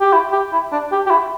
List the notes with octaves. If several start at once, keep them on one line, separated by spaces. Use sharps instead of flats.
G4
E4
G4
E4
D4
G4
G4
E4